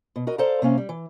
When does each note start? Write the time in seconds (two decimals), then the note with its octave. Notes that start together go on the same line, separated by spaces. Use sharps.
0.16 B2
0.27 F#4 A#4 D#5
0.38 A4 C5 D5 F5 A#5
0.62 C3 A#3 C#4 F5
0.78 G3
0.89 E3